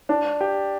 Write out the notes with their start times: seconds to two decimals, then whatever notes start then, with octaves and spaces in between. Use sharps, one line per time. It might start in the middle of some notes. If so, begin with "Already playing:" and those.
0.09 D4
0.41 G4